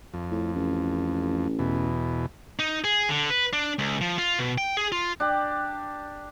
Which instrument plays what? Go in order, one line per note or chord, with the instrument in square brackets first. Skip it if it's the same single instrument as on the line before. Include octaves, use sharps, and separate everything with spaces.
[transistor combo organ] F2
[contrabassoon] A2
A1
[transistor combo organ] E2 B2
[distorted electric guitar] D#4
G#4
D3
B4
D4
C#2
F3
F4
B2
G5
G#4
F4
[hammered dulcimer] D4 G4